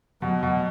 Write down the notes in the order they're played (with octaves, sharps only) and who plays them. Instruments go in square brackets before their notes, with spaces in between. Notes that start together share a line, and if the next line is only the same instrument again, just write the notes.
[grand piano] B2 [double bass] F#3
[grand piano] B2